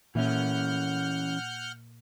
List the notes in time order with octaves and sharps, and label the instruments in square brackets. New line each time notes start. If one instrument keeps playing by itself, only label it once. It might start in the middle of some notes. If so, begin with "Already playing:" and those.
[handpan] A#2 A#3 E5 [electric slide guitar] E3 C#4 [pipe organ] F#5 F6 G6